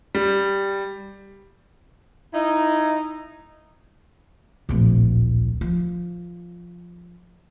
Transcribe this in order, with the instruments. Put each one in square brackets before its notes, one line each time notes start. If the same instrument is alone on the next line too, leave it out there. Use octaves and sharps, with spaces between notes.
[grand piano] G3
[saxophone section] D#4 E4
[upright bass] D1 A#1
F3